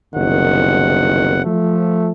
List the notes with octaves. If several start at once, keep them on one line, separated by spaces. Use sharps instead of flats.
F#1 C2 D#3 B3 F#5
F3 A3